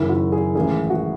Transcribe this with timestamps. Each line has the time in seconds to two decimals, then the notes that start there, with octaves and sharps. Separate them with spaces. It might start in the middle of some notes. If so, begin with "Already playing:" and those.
Already playing: F#1 F#2 D#3 E4
0.09 F#4
0.32 G#4
0.55 A1 G#2 D#3 G#4
0.90 F#4